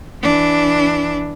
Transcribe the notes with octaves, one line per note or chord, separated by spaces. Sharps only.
E3 D4